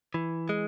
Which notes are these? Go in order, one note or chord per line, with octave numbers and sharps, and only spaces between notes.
E3
G#3